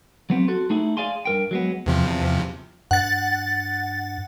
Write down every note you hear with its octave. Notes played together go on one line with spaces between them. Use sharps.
F#3 B3 C4
F#4 A4 C6
A3 D#4 E4 G#4
G#4 D5 F5 G#5 C6
G2 A#4 G5
F#3 G#3 B3
E2 C3 F3
G2 F#5 A6